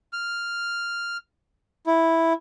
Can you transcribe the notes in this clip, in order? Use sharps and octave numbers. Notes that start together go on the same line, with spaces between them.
F6
E4